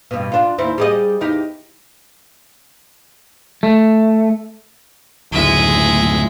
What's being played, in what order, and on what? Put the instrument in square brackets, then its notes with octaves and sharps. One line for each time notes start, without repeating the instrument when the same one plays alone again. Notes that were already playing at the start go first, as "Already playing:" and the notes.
[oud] G2 B2
D4 F4
D#2 C4 E4
G3 G#4 D#5
E2 D#4 G4
[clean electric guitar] A3
[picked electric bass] F#1 D2 A2 [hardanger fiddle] G#3 E5